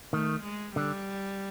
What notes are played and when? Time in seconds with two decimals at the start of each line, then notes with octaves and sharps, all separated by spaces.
0.12 D#3 A3
0.44 G#3
0.76 D3 G3